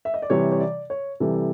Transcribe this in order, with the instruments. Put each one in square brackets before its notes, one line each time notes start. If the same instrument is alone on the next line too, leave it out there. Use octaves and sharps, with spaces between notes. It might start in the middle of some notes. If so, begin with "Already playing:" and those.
[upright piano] E5
D#5
D5
C3 E3 G3 C#5
C#5
D5
C#5
C3 E3 G3 A4